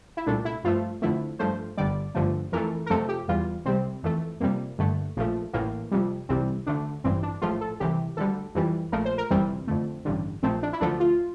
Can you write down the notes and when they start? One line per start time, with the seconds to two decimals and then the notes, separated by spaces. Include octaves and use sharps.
0.17 E4
0.26 C2 A#2 A3 D4
0.45 E4
0.64 G2 F3 A3 F4
1.02 F2 D3 F3 A3 E4
1.39 G2 F3 A3 C5
1.77 G1 G2 D3 G3 D5
2.15 G1 G2 D3 F3 A3
2.52 F2 E3 A3 A#4
2.86 A#4
2.90 F2 C3 F3 A3 A4
3.09 G4
3.28 E2 E3 G3 F4
3.65 C2 C3 G3 C4
4.03 F2 E3 A3
4.40 F2 C3 G3 A#3
4.79 G2 D3 A3
5.17 A#1 A#2 F3 A3
5.53 A1 A2 E3 A#3
5.91 F2 C3 G3
6.29 C2 C3 E3 G3 C4
6.66 D2 D3 A3 D4
7.04 A1 G2 E3 G3 C4
7.23 D4
7.42 A#1 A2 F3 A3 F4
7.61 A4
7.80 C2 C3 E3 G4
8.17 D2 D3 G3 A4
8.55 F2 E3 G3
8.92 A#1 A#2 F3 A3 A#4
9.05 C5
9.18 A#4
9.30 G1 F2 C3 E3 G3 C4
9.67 F2 D3 A3
10.05 A1 G2 D3
10.43 A#1 A#2 F3 A3 C4
10.63 D4
10.73 E4
10.80 D2 D3 F3 A3 D4
11.00 F4